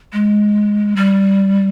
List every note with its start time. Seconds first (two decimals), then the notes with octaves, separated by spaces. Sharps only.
0.13 G#3
0.96 G3